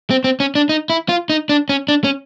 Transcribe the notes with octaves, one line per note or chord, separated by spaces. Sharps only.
C4
C4
C#4
D4
D#4
E4
F4
D#4
D4
C#4
D4
C#4